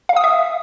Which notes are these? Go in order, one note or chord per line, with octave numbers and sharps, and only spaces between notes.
F5
D#6
E5